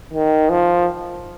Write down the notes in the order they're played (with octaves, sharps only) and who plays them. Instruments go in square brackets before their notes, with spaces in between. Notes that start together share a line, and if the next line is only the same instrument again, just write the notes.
[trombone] D#3
F3